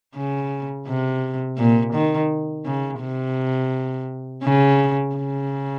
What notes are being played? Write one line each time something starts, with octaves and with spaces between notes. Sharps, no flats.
C#3
C3
A#2
D#3
C#3
C3
C#3
C#3